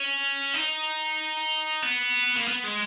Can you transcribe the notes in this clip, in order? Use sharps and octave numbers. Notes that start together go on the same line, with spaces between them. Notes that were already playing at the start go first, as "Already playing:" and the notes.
Already playing: C#4
D#4
B3
A#3
B3
G#3